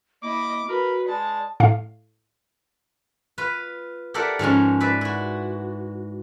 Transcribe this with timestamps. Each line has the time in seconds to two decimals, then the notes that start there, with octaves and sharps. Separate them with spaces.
0.23 A#3 E4 D#5 D6
0.68 F#4 A#4 B4
1.08 G#3 D5 A5
1.60 A2 F5
3.38 F4 B4
4.14 G4 A4 A#4 D5 E5 F#5
4.39 G#2 F3 G#3 C#4
4.80 B4 D5 E5
5.01 E4 F#4